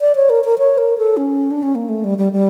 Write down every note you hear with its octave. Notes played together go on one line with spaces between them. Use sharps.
D5
C#5
A#4
A#4
C#5
A#4
A4
C#4
D4
C#4
A#3
A3
G3
G3
G3